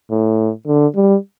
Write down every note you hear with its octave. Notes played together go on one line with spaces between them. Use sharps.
A2
D3
G3